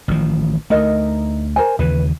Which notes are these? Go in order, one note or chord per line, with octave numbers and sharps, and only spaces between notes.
A1 D#3 F3
D2 A3 D#4 A#4 D#5
A#4 C5 G#5
D#2 C#3 E3 B4